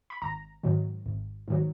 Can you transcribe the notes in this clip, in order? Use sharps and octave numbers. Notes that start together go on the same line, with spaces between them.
B5
G#1 A#5
G#2 D#3 F#3
G#1
G#2 D#3 F#3